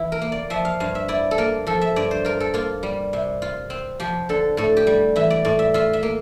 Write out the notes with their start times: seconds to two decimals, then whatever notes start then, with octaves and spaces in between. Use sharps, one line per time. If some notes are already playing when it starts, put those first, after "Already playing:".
Already playing: E3 E4
0.12 A#4
0.21 A#3
0.32 D5
0.50 F3 E5
0.65 F5
0.80 G2 F5
0.95 E5
1.08 E4 D5
1.31 A4
1.38 A#3 A#4
1.67 F3 A4
1.81 E5
1.96 G2 D5
2.11 C5
2.25 F4 A#4
2.40 A4
2.54 A#3 F4
2.83 G3
3.13 C3
3.42 F4
3.70 C4
4.00 F3 G4
4.29 D3 A4
4.57 A2 A4
4.77 G4
4.87 G3
5.16 E3 E5
5.30 D5
5.45 A2 D5
5.59 E5
5.74 F4 E5
5.93 E5
6.03 A#3